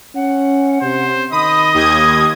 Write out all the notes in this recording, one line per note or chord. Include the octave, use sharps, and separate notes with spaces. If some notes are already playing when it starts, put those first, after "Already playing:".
C#4 F#5
C3 C5
D#3 D#5 B5 D#6
D#2 G4 D#6 G#6